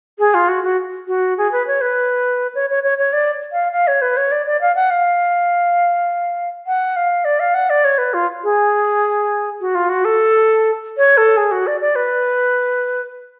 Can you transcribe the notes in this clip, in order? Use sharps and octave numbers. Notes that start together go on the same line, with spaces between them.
G#4
F4
F#4
F#4
F#4
G#4
B4
C#5
B4
C#5
C#5
C#5
C#5
D5
F5
F5
C#5
B4
C#5
D5
D5
F5
F#5
F5
F#5
F5
D5
F5
F#5
D5
C#5
B4
F4
G#4
F#4
F4
F#4
A4
C#5
A4
G#4
F#4
D5
D5
B4